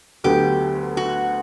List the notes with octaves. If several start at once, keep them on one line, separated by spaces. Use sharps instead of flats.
D2 D3 F#3 B3 G4
F#4